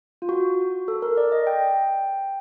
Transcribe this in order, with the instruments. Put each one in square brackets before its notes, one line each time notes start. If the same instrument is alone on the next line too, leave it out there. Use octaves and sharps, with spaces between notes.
[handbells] F4
F#4
A4
A#4
D5
D#5
G5